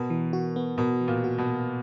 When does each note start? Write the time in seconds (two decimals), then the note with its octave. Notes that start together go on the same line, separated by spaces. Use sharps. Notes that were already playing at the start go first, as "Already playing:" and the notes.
Already playing: B2 A#4
0.10 E3
0.33 F#4
0.56 B3
0.78 B2 A#4
1.01 E3
1.08 A#2
1.24 F#4
1.38 B2
1.46 B3